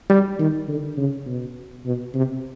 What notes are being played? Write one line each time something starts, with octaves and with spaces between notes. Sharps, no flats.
G3
D#3
D3
C#3
B2
B2
C3